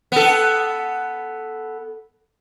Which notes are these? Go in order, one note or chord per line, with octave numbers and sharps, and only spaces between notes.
B3 A4